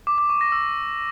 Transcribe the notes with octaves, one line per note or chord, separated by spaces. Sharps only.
D6
D6
C#6
A#6
E6